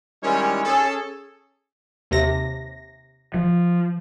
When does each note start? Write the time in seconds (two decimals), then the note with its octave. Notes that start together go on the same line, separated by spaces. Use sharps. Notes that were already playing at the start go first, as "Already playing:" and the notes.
0.22 D#3 G3 G#3 C#4 E4 C#5
0.65 C#4 G#4 A4
2.11 D#2 C3 A#6
3.34 F3